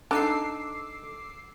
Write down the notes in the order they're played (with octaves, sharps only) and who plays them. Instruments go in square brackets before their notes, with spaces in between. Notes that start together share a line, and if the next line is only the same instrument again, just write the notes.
[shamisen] D4 D#4 [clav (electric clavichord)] A4 [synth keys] D6 E6 C7